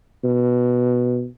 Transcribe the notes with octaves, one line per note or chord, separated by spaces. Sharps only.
B2